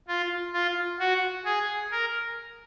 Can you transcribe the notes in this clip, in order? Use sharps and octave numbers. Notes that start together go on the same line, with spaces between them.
F4
F4
F#4
G#4
A#4